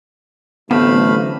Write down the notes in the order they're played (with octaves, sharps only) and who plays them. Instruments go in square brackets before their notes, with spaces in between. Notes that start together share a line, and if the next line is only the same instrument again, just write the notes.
[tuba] A1 [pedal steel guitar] D3 F#3 C4 [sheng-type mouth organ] A3 F5 B5 [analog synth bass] B3